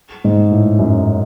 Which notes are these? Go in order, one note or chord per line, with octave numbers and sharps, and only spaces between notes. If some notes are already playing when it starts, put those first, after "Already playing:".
G#2
A2
F#2